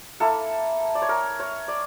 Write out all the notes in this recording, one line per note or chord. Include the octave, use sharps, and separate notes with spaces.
A#3 E4 A4
D5
C#5
A#4
C#5
D5